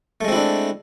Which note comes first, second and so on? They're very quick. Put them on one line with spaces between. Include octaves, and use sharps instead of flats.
A3 G#3 C4 E4 D4